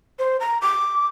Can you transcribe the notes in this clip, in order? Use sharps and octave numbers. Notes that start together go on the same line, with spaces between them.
C5
A#5
D6